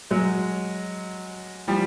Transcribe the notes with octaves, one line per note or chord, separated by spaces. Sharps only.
F#3 G#3
F3 G3